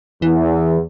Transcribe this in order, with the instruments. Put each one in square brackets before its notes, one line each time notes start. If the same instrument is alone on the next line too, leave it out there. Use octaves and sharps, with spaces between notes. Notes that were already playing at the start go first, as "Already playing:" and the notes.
[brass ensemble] E2 [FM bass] E3